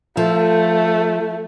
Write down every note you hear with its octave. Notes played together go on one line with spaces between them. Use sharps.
F3 A3